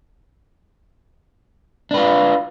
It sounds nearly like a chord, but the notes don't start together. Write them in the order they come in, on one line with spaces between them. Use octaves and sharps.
D4 B4 F4